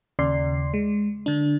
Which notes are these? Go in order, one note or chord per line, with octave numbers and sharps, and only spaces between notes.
D#2 C#3 D5 C6 C7
G#3
D3 D4